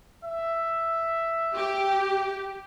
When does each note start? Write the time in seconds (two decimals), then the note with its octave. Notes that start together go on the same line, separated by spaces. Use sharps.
0.24 E5
1.56 G4